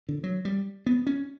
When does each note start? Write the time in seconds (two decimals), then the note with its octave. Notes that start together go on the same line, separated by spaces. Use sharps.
0.09 D3
0.24 F#3
0.45 G3
0.86 B3
1.07 C#4